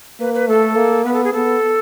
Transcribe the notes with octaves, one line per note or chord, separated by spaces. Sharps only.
A#3 B4
B4
A3 A4
A#3
B3 B4
A4
G#4
B3 A4